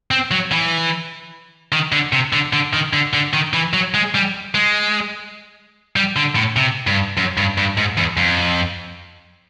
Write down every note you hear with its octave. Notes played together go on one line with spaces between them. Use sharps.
C4
F#3
E3
D#3
D3
C3
D3
D3
D#3
D3
D3
D#3
E3
F#3
G#3
G3
G#3
G3
D3
A2
C3
G2
F#2
G2
G2
G#2
E2
F2